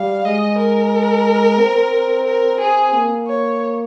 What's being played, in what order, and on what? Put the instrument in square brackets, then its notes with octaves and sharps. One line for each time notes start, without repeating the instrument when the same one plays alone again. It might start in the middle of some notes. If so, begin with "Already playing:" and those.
Already playing: [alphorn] G3 [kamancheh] F5
[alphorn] G#3 [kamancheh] D#5
[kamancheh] A#4
[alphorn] C4
[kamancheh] A#4
G#4
[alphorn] A#3
[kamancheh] C#5